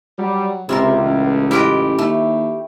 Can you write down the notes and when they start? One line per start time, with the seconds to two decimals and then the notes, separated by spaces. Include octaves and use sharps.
0.18 F#3 G3
0.69 C#2 C3 E4 F4 A#4
1.04 A1
1.51 E4 F4 G4 B4 D#5
1.98 D#2 A3